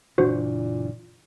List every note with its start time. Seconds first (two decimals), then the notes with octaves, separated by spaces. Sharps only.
0.18 F#1 A#2 E3 D4 F#4 C5